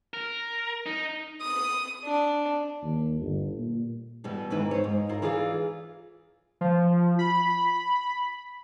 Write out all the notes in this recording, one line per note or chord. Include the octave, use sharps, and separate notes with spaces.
A#4
D#4
D#6
D4
D#2
G1
A#2
B2 E3 G3 B3
G#2 D#3 E3 A#3 B4 E5
C5 C#5
G#2
E4 F4 A#4
E3 F4 G#4 D5 D#5 F5
F3
B5